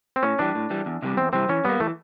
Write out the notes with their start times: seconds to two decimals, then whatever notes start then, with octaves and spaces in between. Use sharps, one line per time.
0.16 C4
0.23 A2 C#4
0.39 E3 G3 D4
0.55 A2
0.70 E3 G3
0.86 E2
1.02 C3 E3 G3
1.17 E2 C4
1.33 C3 E3 G3 C4
1.49 E3 C#4
1.65 G3 A#3 B3
1.80 E3 A3